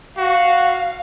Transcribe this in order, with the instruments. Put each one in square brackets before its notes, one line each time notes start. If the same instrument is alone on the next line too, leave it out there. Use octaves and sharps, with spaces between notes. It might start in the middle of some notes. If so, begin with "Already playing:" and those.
[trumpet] F#4 [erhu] F5